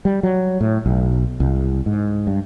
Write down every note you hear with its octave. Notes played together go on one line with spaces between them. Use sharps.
G3
F#3
A2
B1
C2
G#2
G2